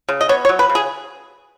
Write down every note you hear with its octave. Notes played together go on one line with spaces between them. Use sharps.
C#3
D#5
B3 C#5
C#5
F#3
B4
C#3
G#4